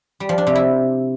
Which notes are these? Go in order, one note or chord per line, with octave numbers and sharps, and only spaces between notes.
G3
F3
D4
C3
E4